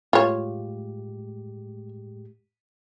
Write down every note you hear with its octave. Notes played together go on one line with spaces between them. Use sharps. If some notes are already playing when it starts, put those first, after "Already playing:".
A2 G#3 F4 G4 C#5